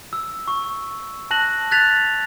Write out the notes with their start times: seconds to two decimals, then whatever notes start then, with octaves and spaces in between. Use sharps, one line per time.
0.13 E6
0.48 C#6
1.31 A5 F#6 A#6 F#7
1.71 F#6 G#6 A6 B6 F7